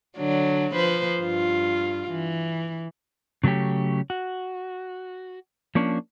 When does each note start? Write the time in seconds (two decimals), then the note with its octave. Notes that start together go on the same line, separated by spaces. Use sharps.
0.18 D3 F#3 D4
0.74 F3 B4 C5
1.20 G2 F4
2.11 E3
3.44 C#3 F#3 A3 C#4 G4
4.10 F#4
5.75 F3 A#3 C#4 D4